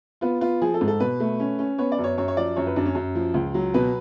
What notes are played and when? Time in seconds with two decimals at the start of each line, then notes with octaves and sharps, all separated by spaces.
0.21 B3 F4
0.41 B3 F4
0.62 F3 G#4
0.74 A4
0.81 G#2
0.88 A4
1.00 B2 B4
1.20 A3
1.40 C#4
1.59 C#4
1.78 B3 C#5
1.92 D5
1.98 F#2
2.04 C#5
2.18 F#2 C#5
2.28 C#5
2.37 F3 D5
2.56 F#2 C#5
2.67 B4
2.76 F#2 D4
2.86 C#4
2.95 F#2
3.15 F3
3.34 C#2
3.54 F#3
3.74 B2 B4